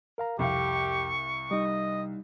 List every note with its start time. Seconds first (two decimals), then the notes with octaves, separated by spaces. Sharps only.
0.18 A#4 F5 A#5
0.39 C2 F2 G4 F5 C#6
1.51 G3 D#4 D#5